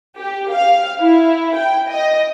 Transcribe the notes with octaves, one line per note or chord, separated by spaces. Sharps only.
G4
F5
E4
G5
D#5